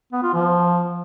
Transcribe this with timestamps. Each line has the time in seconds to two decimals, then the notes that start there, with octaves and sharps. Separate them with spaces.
0.13 B3
0.23 F4
0.34 F3